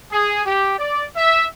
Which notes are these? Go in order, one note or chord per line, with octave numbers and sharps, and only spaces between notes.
G#4
G4
D5
E5